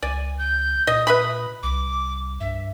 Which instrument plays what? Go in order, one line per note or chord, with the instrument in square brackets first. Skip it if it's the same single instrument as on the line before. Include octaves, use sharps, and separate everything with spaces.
[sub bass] C#2 [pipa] D5 [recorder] G#5
[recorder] G6
[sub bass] A#2 [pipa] D#5 [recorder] D#6
[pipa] B4 E5 B5
[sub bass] C2 [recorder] D6
[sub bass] G2 [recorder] E5